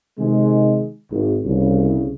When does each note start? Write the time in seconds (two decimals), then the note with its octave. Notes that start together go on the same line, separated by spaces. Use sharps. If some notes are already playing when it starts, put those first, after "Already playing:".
0.19 C3 D#3 G#3
1.11 G#1
1.45 C2 C#3